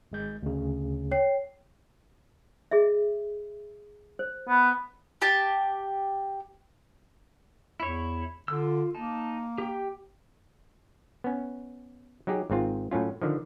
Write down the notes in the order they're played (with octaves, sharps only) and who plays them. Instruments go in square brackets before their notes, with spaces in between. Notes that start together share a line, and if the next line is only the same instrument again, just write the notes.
[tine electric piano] G#1 G#3 G6
D2 C#3
[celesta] C#5 G5 C7
[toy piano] G#4 D#5 E5
C5
[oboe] B3
[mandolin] G4 A5
[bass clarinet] E2 [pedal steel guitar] E4 C#5
[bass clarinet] D3 [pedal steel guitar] F4 E6
[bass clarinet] A#3 [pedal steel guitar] D#4 A5
[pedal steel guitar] G4 G5
[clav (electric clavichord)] B3 C#4
F#3 D#4 G4 G#4
G#1 G#2 C4 F4
A2 F#3 C#4 F4
D3 D#3 F3